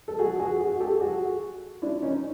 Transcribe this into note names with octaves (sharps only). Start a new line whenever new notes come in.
A4
F#4 G#4
F#4 G#4
F#4 G#4
G4 A4
F#4 G#4
D4 E4
C#4 D#4